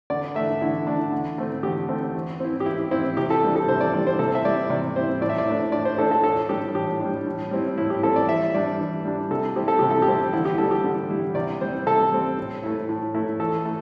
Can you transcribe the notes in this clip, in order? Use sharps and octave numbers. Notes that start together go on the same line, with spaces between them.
D3 D5
A3 D4 E5
D3 E4
A3 D4
D3
A3 C4
D3 G4
A3 C4
E3
C4 E4
G4
E3 E4
C4 E4
C3 G4
A4
E3 G3 D4
A4
C3 C5
D5
E3 G3 D4 D5
C5
C3 A4
E5
G3 C4 E4 D5
C3 D5
G3 C4 E4 C5
A2 D5
E5
D5
A3 D4
A2 D5
C5
A3 D4 A4
A4
A2 A4
G3 D4 G4
A2 G4
G3 D4
A2
G3 C4 E4
A2 E4
G4
G3 C4 E4 A4
D5
E3 E5
G3 D4 D5
E3
G3 D4
C3 A4
G3 C4 E4 G4
A4
C3 G4
A4
G4
G3 C4 E4
D3 E4
G4
G3 E4 A4
G4
D3
G3 E4
C3 D5
G3 C4 C5
C3 A4
G3 C4
A2
A3 E4
A2
A3 E4
E3 A4
A3